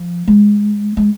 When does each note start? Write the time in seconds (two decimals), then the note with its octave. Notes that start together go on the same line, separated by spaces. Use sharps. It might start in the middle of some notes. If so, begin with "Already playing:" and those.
Already playing: F3
0.27 G#3
0.97 G#3